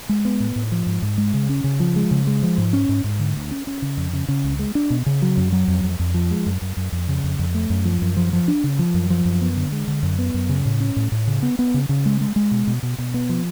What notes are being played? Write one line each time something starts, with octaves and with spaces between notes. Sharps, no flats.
G#3
B3
A2
A2
F3
G#2
G#2
G#3
C#3
C#4
C#3
F3
G#3
C#3
G#3
F3
G#2
C#4
G#2
G#2
D3
D2
C#4
C#4
C#3
F2
C#3
C#3
C#2
G#3
D4
B2
C#3
F#3
F#2
F#3
F2
F2
F2
F3
G#3
F#2
F#2
F#2
F2
C#3
F2
F2
A3
F#2
F3
F#2
F3
F3
D4
C#3
F3
F#2
F3
F#2
B3
D3
G#3
D3
F#2
B3
F#2
C#3
A2
C#4
A2
A2
C#3
B3
B3
C#3
C#3
G#3
G#3
G#3
B2
B2
B2
B2
B3
F3